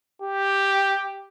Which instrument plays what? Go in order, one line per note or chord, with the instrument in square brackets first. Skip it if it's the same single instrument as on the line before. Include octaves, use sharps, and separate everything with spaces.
[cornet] G4